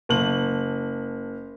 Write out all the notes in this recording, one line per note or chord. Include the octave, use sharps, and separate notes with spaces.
F#1 F#7